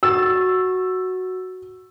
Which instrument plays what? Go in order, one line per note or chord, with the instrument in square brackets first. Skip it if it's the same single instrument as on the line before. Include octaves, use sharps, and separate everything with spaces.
[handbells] F#4 A6 [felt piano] E6